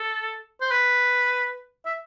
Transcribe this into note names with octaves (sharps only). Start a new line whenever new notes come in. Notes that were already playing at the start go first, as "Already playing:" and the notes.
Already playing: A4
C5
B4
E5